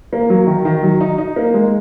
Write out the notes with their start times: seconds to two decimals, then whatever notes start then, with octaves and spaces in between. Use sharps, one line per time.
0.13 A#3
0.30 F#3
0.47 D#3
0.65 D#3
0.83 F#3
1.01 D#4
1.18 D#4
1.36 A#3
1.54 G#3